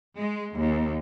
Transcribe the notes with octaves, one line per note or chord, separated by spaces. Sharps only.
G#3
D#2